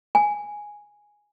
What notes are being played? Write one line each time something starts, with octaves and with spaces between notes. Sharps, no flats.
G#5